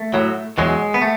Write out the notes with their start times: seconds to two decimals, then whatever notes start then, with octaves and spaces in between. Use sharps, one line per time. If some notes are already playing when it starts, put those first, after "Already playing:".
Already playing: A3
0.14 A2 F#3
0.58 E2 B2 F#3 G#3
0.94 B3
1.02 A3